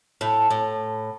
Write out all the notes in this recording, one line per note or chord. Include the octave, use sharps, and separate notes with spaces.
A2
A2